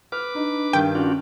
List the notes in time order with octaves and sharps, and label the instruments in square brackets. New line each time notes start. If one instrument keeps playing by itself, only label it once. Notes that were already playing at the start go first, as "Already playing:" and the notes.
[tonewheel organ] B4 D6 [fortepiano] F6
[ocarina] D4 [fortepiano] D#4
[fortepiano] G2 D#3 [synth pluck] G5
[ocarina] C#4 [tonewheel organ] D4 F4 F#4